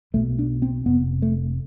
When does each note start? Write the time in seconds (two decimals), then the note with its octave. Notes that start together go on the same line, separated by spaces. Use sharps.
0.14 B1 B2 A3
0.39 D4
0.62 C4
0.86 F1 F2 C3 B3
1.22 A3